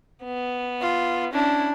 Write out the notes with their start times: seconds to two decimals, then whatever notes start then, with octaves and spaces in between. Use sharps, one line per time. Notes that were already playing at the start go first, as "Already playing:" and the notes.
0.24 B3
0.81 F4
1.33 C#4 D4 E4